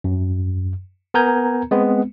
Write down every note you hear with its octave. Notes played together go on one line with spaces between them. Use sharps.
F#2
B3 A#4 G#5 A#5 G6 G#6
G#3 B3 C4